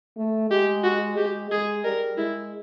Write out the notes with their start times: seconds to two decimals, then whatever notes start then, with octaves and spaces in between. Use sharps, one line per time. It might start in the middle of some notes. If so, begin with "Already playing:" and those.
0.17 A3
0.50 G#3 G4
0.83 F#4
1.17 G#3 G4
1.50 G#3 G#4
1.84 G3 A#4
2.18 G#3 E4